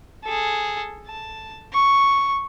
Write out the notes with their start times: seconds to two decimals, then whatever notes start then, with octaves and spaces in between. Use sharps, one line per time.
0.25 G#4 A4
1.07 A5
1.73 C#6